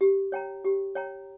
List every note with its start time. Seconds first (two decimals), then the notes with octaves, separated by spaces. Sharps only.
0.01 G4
0.32 C#5 G5 A#5
0.65 G4
0.95 C#5 G5 A#5